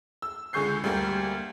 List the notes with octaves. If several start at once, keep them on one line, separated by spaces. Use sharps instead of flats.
E6
C#2 D3 G#4 C#6 G6 C7
D2 G3 A#3